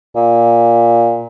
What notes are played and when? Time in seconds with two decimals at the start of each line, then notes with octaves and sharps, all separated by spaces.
0.16 A#2